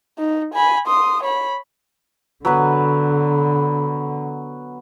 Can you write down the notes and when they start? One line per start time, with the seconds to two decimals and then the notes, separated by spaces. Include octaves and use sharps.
0.19 D#4
0.54 G#5 B5
0.87 C6 D#6
1.23 C#5 B5
2.45 D3 F#3 B3 B4